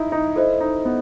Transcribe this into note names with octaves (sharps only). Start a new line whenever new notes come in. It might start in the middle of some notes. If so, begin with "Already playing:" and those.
Already playing: D#4 E4
D#4
E4 A4 C5 D#5
D#4
B3